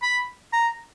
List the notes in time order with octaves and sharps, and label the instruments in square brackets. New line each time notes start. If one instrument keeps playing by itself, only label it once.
[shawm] B5
A#5